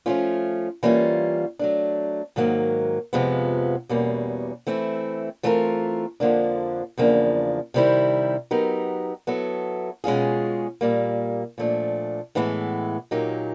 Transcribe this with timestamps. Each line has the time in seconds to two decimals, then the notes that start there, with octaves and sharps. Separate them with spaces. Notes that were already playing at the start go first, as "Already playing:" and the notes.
0.06 F3 A3 C#4 F4
0.83 E3 G3 A#3 C#4 F4
1.59 F#3 A3 D4
2.36 G#2 D#3 F#3 A#3
3.13 F2 C3 F3 G#3 B3
3.89 E2 B2 G3 A#3 C#4
4.67 E3 A3 C4 E4
5.43 E3 A3 C4 F4 A#4
6.20 F2 D3 F3 A#3 D4
6.98 E2 C#3 F3 A#3 D4
7.74 C3 D#3 G3 C4 E4
8.51 F#3 B3 D#4 G4 A#4
9.27 F#3 B3 E4 A4
10.04 B2 G#3 C#4 F4 G#4
10.81 A#2 G3 A#3
11.58 A#2 F3 A3 D4
12.35 A2 E3 G#3 B3
13.11 A#2 F#3 A#3 D#4 G4